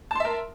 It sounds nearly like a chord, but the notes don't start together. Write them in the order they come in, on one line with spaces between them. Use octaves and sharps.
A5 C6 E5 A#4